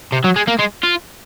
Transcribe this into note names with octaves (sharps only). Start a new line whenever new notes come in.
C3
F#3
G#3
A#3
G#3
F4